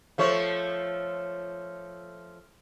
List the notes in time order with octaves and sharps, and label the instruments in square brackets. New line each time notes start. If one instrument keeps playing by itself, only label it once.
[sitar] F3 A3 C#5